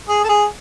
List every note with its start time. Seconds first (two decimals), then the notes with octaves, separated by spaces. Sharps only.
0.08 G#4
0.24 A4
0.29 G#4